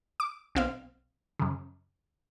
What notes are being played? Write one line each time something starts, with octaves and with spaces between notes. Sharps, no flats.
D6
B1 C4 F5
F#2 C#3